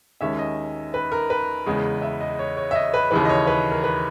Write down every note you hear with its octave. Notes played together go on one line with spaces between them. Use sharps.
D#2 D#3 G#3 C#4 E5
D#5
B4
A#4
B4
E2 C#3 G#3
E5
D#5
C#5
C#5
E5
D#5
B4
D#2 C#3 E3 B4
D#5
C#5
B4
A#4
B4